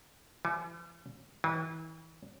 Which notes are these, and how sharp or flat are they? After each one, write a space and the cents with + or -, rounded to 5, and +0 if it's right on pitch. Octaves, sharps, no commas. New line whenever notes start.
E3 +45
E3 -35